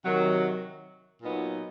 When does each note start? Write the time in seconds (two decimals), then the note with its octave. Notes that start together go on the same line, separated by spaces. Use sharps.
0.04 C3 D#3 F#3
1.21 A#2 F#3 B3 D#4